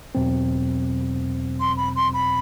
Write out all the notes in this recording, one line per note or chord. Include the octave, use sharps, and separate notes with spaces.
E2 B2 F#3 C4
C6
B5
C6
B5